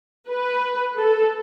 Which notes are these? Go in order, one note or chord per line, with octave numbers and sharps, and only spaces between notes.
B4
A4